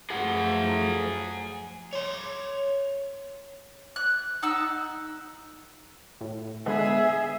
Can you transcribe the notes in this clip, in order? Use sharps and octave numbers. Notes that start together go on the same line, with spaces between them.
F#2 F3 A3 G#4 F#5
C#5 C6
F#6
D#4 F#5 E6
A2
D3 G#3 B3 G#4 E5